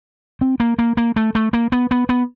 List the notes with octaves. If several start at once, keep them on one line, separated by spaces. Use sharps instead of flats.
C4
A#3
A#3
A#3
A3
A3
A#3
B3
B3
B3